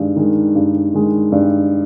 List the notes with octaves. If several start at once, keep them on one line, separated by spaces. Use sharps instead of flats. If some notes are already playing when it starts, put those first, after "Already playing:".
Already playing: G2 D#3 G#3
D#3 G#3
G2
D#3 G#3
G2